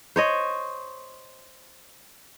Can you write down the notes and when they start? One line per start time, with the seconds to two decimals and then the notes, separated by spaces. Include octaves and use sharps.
0.16 C5 C#5 D#5